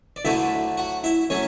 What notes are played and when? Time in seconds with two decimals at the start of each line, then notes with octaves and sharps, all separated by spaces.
0.16 D5
0.25 D2 D3 F#3 A3 E4 E5
0.77 F#4 F#5
1.04 E4 E5
1.30 F#3 A3 C#4 C#5